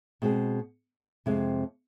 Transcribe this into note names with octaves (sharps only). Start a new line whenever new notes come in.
B2 G#3 C4 G#4
F2 C3 G#3